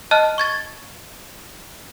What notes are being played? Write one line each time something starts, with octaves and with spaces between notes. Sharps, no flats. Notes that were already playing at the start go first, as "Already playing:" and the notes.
D#5 A5 F6 F#6
C#6 G#6 A6